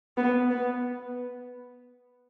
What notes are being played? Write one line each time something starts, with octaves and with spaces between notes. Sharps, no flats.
B3
B3